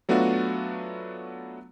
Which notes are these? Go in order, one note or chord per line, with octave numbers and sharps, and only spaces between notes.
F#3 A3 B3 D4 F4 F#4